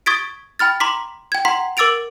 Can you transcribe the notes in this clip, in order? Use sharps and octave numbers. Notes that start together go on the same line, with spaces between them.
C#6 D#6 G#6 A6 B6 D7
G5 B5 F6 A6
A#5 C6 D6 B6
G5 G#6
F#5 A#5 C6 B6
A#4 D6 E6 A6 D7 F7